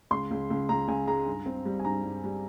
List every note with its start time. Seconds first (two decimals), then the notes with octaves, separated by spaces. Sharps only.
0.11 C#2 C6
0.31 C#2
0.50 C#2
0.69 C#2 A#5
0.88 C#2 G#5
1.07 G#3 A#5
1.26 G2
1.46 C4
1.65 G3
1.80 G#5
1.85 G2 A#5
2.04 G2
2.24 G3